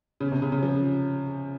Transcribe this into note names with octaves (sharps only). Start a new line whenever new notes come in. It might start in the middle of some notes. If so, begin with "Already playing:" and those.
C#3
C3
C#3
C#3
F3